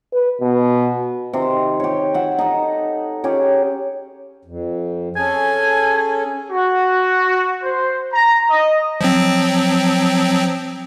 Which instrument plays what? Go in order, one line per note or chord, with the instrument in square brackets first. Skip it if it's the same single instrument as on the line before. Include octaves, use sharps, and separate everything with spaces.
[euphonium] B4
B2
[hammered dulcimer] C3 D#3
G4 C#5
E5 F#5
D#4 A4
C#4 G4 G#4 C#5
[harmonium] F2
[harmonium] C#4 G#4 A4 [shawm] G#5
[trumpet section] F#4
C5
A#5
D#5
[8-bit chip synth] F3 F#3 C4